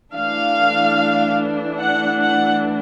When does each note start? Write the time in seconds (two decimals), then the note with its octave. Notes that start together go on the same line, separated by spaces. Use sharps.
0.14 E3 A3 D4 F5
1.80 F#5
2.21 F#5